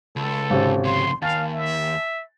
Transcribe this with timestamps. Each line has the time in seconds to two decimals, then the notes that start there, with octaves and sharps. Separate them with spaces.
0.16 C#2 A4
0.50 G#1 C3 C#4
0.83 F2 C#3 C6
1.22 D#2 F5 G#5 A5 A6
1.52 E5